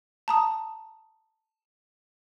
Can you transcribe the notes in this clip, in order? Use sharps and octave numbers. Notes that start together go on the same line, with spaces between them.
A5 A#5 D#6